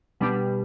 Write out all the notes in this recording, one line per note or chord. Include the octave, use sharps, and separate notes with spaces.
B2 G3 B3 D4 G4